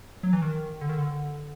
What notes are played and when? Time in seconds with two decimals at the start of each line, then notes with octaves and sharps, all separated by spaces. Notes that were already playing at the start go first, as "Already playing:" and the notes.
0.23 F#3
0.33 E3
0.42 D#3
0.81 D3
0.89 D#3
0.98 D3